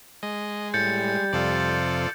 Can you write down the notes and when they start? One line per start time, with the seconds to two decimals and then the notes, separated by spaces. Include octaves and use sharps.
0.23 G#3 D#5
0.74 A2 G3 G6 A6 C#7
1.33 F2 C3 F4 A4 D5